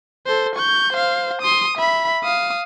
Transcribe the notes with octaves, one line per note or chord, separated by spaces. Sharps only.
A4 C5
C#6 G6
C5 F5
C6 D#6
E5 B5
F5 D#6